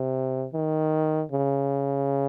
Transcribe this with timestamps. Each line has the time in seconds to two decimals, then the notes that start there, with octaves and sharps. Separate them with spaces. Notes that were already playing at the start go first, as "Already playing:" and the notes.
Already playing: C3
0.54 D#3
1.32 C#3